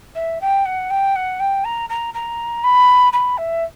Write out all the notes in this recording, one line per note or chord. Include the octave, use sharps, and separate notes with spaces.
E5
G5
F#5
G5
F#5
G5
A#5
A#5
A#5
B5
B5
E5